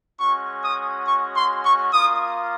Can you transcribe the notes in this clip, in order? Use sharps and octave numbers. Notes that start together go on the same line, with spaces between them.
G#3 C#4 F#4 C#6
D#6
C#6
C6
C#6
A#3 F4 D#6